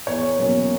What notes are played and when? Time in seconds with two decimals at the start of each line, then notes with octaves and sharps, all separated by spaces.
0.07 E2 C#5
0.39 B2 F#3 A#3 C#4